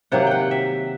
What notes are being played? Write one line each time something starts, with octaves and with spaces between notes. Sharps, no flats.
C3 D#3 F#3 A#3 F#5
F#5 G5
E5